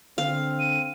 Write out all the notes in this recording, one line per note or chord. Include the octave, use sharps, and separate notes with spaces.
D3 C4 F5
D#7